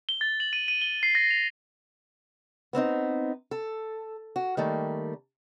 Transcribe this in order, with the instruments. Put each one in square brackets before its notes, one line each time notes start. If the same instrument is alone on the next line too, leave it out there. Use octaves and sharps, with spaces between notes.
[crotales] G7
A6
F#7
D#7
D#7
G7
C7
A#6
F7
[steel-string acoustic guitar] B3 C4 D4 D#4
A4
F#4
D#3 G3 A3 A#3